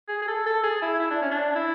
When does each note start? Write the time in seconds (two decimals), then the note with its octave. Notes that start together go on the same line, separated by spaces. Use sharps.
0.08 G#4
0.22 G#4
0.27 A4
0.46 A4
0.63 G#4
0.82 E4
1.00 E4
1.11 D4
1.22 C#4
1.31 D4
1.55 E4